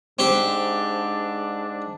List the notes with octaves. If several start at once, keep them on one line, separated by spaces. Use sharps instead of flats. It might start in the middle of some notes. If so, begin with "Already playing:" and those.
G#2 C4 D4 G4